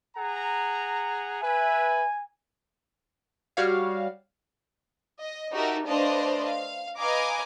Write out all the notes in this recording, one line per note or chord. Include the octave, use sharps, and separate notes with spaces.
G#4 F#5 A#5
B4 E5 G#5
G3 F#4 C#5 F5
D#5
D#4 F#4 G4 A4 A#4 E5
A3 D4 B4 C5 D#5 F5
F5
B4 D#5 F5 G#5 A#5 D6